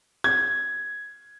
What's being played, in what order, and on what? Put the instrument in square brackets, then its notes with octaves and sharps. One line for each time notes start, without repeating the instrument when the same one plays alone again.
[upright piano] G#6